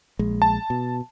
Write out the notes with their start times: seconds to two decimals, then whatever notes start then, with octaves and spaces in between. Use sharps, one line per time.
0.19 A#1 G#3
0.42 A5
0.70 B2